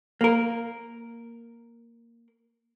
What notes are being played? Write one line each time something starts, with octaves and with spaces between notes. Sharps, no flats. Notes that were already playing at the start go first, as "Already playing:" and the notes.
A#3 A#4